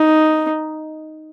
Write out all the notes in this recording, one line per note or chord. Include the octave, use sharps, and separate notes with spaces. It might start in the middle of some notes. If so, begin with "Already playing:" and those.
Already playing: D#4